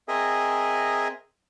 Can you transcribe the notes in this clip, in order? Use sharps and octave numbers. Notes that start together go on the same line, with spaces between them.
C4 G#4 A#4 D#5 E5 G#5